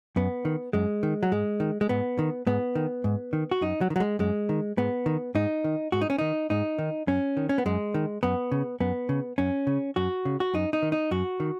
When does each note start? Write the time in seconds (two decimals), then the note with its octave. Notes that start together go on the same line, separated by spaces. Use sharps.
0.16 F#2 B3
0.45 D#3
0.73 F#2 G#3
1.03 D#3
1.23 F#3
1.32 G#2 G#3
1.60 D#3
1.81 G#3
1.89 G#2 B3
2.19 D#3
2.47 G#2 B3
2.75 D#3
3.04 G#2
3.33 D#3
3.51 F#4
3.61 F#2 D#4
3.81 F#3
3.90 D#3
3.96 F#3
4.00 G#3
4.19 F#2 G#3
4.49 D#3
4.77 G#2 B3
5.06 D#3
5.35 G#2 D#4
5.64 D#3
5.92 G#2 F#4
6.01 D#4
6.10 C#4
6.18 D#3 D#4
6.50 G#2 D#4
6.79 D#3
7.07 F#2 C#4
7.37 D#3
7.49 C#4
7.58 B3
7.66 F#2 G#3
7.94 D#3
8.23 F#2 B3
8.52 C#3
8.80 F#2 B3
9.09 C#3
9.38 F#2 C#4
9.67 C#3
9.96 F#2 F#4
10.25 C#3
10.40 F#4
10.54 F#2 D#4
10.73 D#4
10.82 D#3
10.92 D#4
11.11 F#2 F#4
11.40 D#3